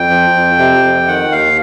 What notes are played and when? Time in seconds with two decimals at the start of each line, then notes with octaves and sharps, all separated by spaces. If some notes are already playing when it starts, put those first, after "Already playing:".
Already playing: F2 G5
0.10 F3
0.34 F2
0.58 C3
0.83 F2
1.08 D#3 F#5
1.32 D#2 F5